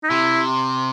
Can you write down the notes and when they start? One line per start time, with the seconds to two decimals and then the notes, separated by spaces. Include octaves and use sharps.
0.04 D#4
0.10 C3 E4